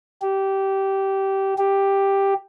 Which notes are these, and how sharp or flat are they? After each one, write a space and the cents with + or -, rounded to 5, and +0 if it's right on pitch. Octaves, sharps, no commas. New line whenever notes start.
G4 -15
G4 +5